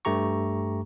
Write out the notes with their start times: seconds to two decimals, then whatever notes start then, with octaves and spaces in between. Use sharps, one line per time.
0.05 G2 A3 G4 A#5 C#6